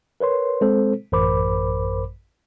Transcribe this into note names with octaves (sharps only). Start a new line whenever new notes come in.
A#4 B4 C#5 C6
G#3 C4 A4 C5
A1 F#2 A#4 C5 B5 D6